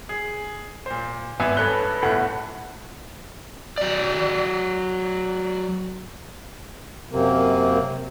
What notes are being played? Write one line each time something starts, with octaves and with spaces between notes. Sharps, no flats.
G#4
A#2 C5
G#1 B3 E5 G#5
G2 A4 B4 C#5 F#6 G7
G1 A2 A3 F#5
F#3 D5
F#2 C3 A#3